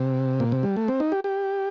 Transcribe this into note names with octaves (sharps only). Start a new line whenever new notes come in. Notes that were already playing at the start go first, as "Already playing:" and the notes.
Already playing: C3
A#2
C3
G3
A3
C4
D#4
G4
G4